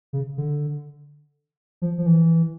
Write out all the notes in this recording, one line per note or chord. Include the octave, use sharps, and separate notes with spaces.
C#3
D3
F3
F3
E3